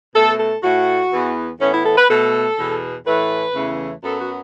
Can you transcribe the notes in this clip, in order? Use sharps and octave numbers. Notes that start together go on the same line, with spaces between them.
B2 A3 A4
A4
A2 A3 F#4
E2 E3 B3
A2 E3 B3 C#4
E4
A4
B4
B2 A3 A4
E2 B2 B3
A2 E3 A3 B4
E2 C#3 E3 A3
F#2 F#3 B3 A4
F#4